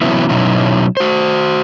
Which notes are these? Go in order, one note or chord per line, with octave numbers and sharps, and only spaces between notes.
C3 E3 F#3 B3 C#4 E4
B2 F#3 C#4 D#4 E4
F#4 C5